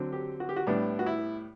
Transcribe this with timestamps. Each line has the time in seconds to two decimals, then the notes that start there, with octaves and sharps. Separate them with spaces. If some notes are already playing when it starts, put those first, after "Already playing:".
Already playing: D3 F#3 C4
0.13 G4
0.40 F#4
0.49 G4
0.56 F#4
0.67 A2 G3 B3 D4
0.99 F#4
1.06 E4